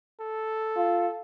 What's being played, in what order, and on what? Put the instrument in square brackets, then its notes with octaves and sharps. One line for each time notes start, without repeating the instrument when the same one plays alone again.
[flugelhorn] A4
[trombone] F4